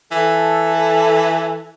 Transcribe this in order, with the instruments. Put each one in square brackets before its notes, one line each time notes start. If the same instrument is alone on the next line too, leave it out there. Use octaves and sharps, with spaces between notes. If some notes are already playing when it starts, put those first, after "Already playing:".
[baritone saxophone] E3 [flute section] A4